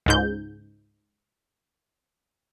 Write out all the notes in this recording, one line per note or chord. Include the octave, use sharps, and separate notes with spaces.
C#2 G#2 G6